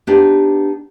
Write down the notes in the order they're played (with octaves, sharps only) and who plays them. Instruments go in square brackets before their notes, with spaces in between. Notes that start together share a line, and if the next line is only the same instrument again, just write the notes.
[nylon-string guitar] B3 D4 D#4 G4